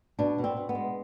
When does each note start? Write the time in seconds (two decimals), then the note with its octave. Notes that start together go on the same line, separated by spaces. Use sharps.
0.19 B2 D4
0.38 B2
0.44 C4
0.57 B2
0.69 B3
0.75 G#3